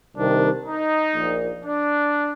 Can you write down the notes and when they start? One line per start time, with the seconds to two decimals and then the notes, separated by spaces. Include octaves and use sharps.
0.15 C2 C3 D#3 D4
0.65 D#4
1.15 A#1 A#2
1.64 D4